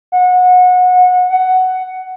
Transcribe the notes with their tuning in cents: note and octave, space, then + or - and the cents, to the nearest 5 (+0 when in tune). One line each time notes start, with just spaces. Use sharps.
F#5 -25
F#5 +10